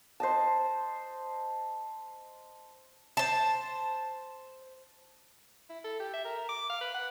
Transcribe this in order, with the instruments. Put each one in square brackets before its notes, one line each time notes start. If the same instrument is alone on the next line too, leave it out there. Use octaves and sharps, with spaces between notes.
[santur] C5 D#5 A5
[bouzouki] C5 A5
[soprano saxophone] E4
A4
G4
E5
A#4
D6
F5
B4
F#5